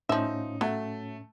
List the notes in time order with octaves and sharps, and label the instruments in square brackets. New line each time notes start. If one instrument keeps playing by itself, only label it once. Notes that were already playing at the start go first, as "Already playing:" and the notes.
[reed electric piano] A2 C#4 [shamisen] F3 E5 [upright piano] D#4
[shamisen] F#3 [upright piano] A3